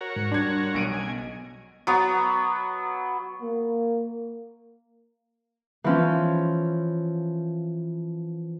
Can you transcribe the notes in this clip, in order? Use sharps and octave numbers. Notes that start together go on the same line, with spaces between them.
F#4 A#4 C#5
G#2
G3 D4 C6 G#6
B1 D7 D#7
C#3 G3 C#4 G#5
B3 G#4 D#5
F#3 B3
A#3
E3 F3 C#4